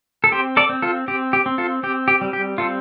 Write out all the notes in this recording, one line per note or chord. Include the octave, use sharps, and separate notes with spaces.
A4
C4 G4 C5
A4 D5
C4
F4 A4
C4 G4
G4
C4
F4 A4
C4 G4
G4
G3
G4
C4 F4 A4